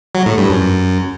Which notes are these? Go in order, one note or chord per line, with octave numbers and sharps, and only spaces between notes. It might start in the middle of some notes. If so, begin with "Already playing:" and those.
F#3
A2
G2
F#2